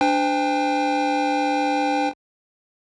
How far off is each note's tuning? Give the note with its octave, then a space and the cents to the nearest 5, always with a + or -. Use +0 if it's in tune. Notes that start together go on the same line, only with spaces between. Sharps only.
D4 +0 C5 -35 G5 +35